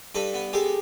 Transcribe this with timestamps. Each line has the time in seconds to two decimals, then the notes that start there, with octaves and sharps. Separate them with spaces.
0.15 G2 A4 B4
0.34 B3
0.53 G#3 G4 A4